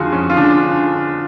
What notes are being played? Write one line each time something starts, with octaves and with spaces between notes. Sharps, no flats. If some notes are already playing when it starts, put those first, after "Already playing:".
Already playing: F2 D3 F4 F#4 G#4
F2 C#4
F4
D3 D4